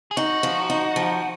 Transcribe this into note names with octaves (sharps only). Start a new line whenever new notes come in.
G#4
D#4 F#4
F3
D#4
F3